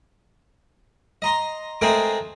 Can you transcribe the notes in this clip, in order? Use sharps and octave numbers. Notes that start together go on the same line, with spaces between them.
D#5 A#5 C6
G#3 A3 C4 G#4 A#4 C5